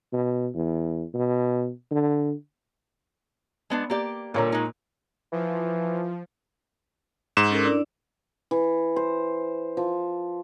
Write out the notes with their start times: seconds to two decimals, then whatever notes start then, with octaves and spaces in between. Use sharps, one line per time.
0.13 B2
0.54 E2
1.14 B2
1.91 D3
3.70 G#3 B3 D4
3.90 A#3 G4 D5
4.34 A#2 D3 G3 C#5 A#5
4.52 G#3 D#4
5.32 E3 F3
7.37 G#2 E7
7.50 C#4 A4 A#4
7.64 D4 E4 D5
8.51 E3
8.96 C5
9.77 F3